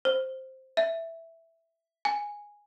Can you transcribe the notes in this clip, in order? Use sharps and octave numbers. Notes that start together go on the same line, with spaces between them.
C5
E5
G#5